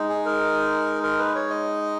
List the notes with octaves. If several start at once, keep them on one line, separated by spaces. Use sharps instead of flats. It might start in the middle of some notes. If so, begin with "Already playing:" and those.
Already playing: G#3 D#4
G#4
A#4
A#4
B4
C#5
D#5